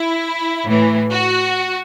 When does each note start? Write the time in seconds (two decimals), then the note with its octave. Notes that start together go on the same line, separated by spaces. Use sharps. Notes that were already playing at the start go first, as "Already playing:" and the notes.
Already playing: E4
0.66 A2 E3
1.10 F#4